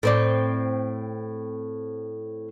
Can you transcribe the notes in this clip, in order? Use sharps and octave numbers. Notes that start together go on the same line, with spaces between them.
A2 C4 D5